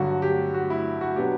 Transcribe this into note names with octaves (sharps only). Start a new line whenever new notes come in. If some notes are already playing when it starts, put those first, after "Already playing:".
Already playing: G2 D3 F#3 F#4
G4
F#4
E4
F#4
B2 F#3 B3 D4 G4